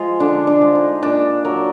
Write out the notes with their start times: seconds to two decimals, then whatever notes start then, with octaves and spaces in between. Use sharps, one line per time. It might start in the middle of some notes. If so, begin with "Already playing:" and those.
Already playing: F3 G#3 F4 G#4
0.20 D3 D4
0.47 D4
0.61 F3 G#3
0.75 D#4
1.03 A#2 D4
1.45 F#3 A#4